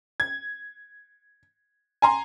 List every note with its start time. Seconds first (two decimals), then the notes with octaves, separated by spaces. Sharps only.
0.20 G#6
2.02 G#5 A#5 C6